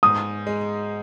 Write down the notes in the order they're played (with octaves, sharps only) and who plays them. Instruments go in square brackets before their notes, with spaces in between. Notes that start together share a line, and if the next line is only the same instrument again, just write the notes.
[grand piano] G#2 [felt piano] D#6
[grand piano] G#3